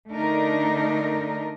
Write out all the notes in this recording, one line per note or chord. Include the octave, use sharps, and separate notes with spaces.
D3 A3 D4 D#4 A#4